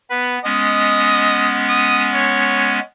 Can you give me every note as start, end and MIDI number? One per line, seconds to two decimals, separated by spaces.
0.10 0.39 59
0.10 0.37 71
0.44 2.79 56
0.44 2.79 59
0.44 2.79 61
0.44 1.63 75
1.68 2.05 87
2.14 2.82 73